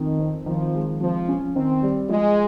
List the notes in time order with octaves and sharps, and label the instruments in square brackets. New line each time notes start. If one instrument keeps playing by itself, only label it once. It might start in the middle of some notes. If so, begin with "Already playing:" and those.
Already playing: [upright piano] F2 [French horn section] D#3
[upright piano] C4
[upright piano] D#3 [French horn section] F3
[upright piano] G#3
[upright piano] C3 [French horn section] F3
[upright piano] C#4
[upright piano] D#3 [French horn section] C4
[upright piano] G3
[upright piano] F3 [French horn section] G#3